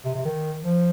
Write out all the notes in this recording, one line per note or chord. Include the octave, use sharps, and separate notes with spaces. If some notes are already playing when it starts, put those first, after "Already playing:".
C3
C3
D#3
F3